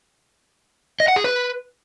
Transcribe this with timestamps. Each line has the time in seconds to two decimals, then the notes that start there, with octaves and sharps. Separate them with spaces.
1.00 D#5
1.08 F#5
1.16 G#4
1.24 B4